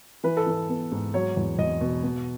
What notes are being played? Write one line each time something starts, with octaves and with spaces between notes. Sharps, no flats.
E3 B4
A4
E3 B4
B3
G#2
F#3 C#5
E2
E2 D#5
B2
B2